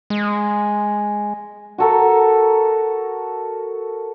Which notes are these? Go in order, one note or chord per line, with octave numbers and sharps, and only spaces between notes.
G#3
F#4 A4 A#4